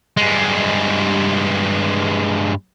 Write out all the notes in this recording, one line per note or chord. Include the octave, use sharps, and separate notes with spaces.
G2 G#3